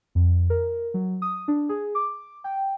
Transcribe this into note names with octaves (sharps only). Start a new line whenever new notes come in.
F2
A#4
F#3
D#6
D4
G#4
D6
G5